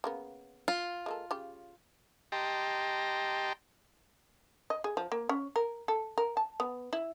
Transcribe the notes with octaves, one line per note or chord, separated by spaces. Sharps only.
C#3 A#3 B3
F4
G#3 A#3 A4
C#3 G4
G4 D#5 G5 A5 A#5 C6
D#5
G#4
F3
A#3
C#4
A#4
A4
A#4
A5
B3
E4